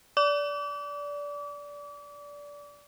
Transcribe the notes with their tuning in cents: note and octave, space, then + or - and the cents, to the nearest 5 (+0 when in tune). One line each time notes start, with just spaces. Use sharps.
D5 -20 D6 -35